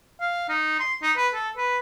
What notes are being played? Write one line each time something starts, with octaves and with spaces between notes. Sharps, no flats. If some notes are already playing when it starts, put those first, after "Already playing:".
F5
D#4
C6
D#4
B4
A4
B4